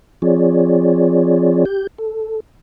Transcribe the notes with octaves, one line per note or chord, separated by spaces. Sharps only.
F3 C4 F4 G#4 C#5 D5
G4 G6
A4